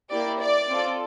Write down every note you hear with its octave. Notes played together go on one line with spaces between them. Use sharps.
A#3 E4 G4 D5
D5
C4 F4 A4